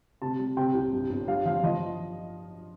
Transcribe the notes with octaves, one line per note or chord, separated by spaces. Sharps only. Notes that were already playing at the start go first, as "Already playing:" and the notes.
C3 A5
G3
C3 G5
C2
G2
G1
G2 F5
F3 F5
F3 D#5